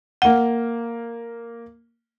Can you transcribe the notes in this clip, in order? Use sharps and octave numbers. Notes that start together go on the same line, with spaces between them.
A#3 F#5 G7